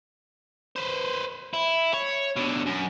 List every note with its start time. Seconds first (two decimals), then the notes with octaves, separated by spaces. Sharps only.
0.76 B4 C5
1.53 E4
1.94 C#5
2.36 B2 D3
2.66 F#2